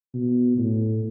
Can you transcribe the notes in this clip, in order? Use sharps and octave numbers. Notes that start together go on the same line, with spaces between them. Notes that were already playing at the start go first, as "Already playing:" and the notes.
B2
A2